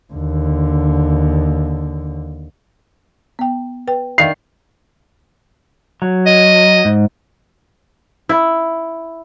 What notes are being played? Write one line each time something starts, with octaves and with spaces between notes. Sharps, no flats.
D#2 D3
B3 G5
B4 G5
D#3 D4 E5 F5 C7 F7
F#3
D#5
G#2
E4